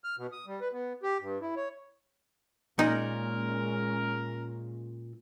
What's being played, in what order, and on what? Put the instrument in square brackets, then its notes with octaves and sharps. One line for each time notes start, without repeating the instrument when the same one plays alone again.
[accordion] F6
B2
D#6
G3
B4
B3
G4
G2
E4
C#5
[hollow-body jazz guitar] A#2 [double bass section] G#3 A#3 C#4 [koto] D#4 [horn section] A#4